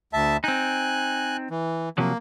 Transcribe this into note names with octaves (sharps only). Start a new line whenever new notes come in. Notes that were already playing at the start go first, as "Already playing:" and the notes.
D2 E5 A5
C4 D#4 G#5 F#6
E3
C3 F3 F#3 A#3